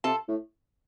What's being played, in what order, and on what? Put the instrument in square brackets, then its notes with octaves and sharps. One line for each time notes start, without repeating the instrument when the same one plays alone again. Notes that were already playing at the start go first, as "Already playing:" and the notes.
[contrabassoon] C3 [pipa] F4 A4
[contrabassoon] A2